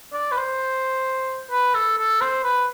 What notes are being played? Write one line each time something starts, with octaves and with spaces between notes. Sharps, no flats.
D5
B4
C5
B4
A4
A4
C5
B4